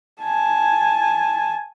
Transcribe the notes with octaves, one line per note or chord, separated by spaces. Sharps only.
G#5 A5